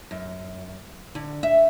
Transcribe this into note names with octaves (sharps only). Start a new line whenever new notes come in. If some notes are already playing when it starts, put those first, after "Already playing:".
F#2
D3
E5